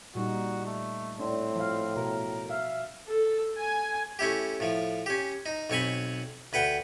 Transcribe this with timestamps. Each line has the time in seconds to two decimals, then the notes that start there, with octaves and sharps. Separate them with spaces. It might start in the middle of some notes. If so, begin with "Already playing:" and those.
0.15 A#2 G3 D#4 F#4
0.66 A3
1.19 A2 C4 D4
1.56 F3 F5
1.96 B2 A#4
2.50 E5 F5
3.07 A4
3.58 G#5
4.19 A3 C#4 E4 G4
4.60 A2 F3
5.06 C#4 G4
5.46 D#4
5.70 B1 C4 C#5 G#5 B5
6.53 D2 B4 F#5 G5